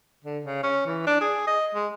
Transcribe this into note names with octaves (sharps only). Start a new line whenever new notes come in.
D3
C#3
C#4
E3
D4
G#4
D#5
G#3